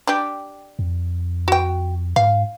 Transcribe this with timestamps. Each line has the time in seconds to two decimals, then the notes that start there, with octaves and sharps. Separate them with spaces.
0.07 D4 G4
0.79 F2
1.48 F#4 G5
2.16 G#2 F5